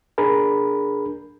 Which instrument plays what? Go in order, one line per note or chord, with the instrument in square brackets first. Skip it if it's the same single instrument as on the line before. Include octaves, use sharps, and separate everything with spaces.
[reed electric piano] D4 G#4 A#4 B5